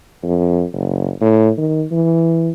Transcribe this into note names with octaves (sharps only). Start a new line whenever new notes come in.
F2
F#1
A2
D#3
E3